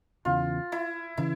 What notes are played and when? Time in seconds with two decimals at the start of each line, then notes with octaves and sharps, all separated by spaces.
0.25 E2 C#3 E3 F4
0.72 E4
1.18 C#3 E3 E4